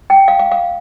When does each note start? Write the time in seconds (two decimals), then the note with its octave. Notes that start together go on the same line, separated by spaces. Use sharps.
0.10 G5
0.28 F5
0.39 F5
0.51 F5